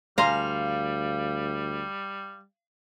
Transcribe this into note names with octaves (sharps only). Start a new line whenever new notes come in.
D2 G3 C5 F5 G#5 A#5